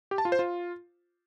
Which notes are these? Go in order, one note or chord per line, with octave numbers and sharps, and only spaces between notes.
G4
A5
F4
C5
F4